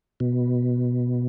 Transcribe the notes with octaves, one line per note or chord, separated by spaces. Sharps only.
B2